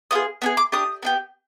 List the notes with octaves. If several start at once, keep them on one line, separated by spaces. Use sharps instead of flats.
B3 F4 G#4 D#6
B3 D4 G#4
D6
D4 G4 D#6
B3 D4 G4